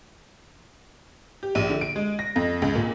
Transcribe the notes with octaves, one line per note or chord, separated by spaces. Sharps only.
G4
A#1
D3
D7
G#3
A#6
F2
C#2
A#2